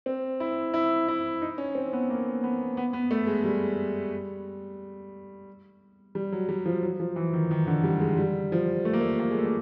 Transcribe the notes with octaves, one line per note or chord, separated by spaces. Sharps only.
C4
E4
E4
E4
D#4
C#4
C4
B3
A#3
B3
B3
B3
A3
G#3
G3
G3
F#3
G3
F3
F#3
F3
E3
D#3
D#3
D3
G3
G#3
G3
F3
A3
A#3
A3
A#3
G#3
A3
A#3